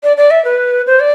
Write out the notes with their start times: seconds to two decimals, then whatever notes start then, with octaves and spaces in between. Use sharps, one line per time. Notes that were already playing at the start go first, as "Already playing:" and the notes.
0.03 D5
0.17 D5
0.31 E5
0.45 B4
0.87 C5
1.00 D5